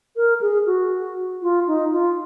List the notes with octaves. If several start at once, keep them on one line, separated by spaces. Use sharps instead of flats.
A#4
G#4
F#4
F4
D#4
F4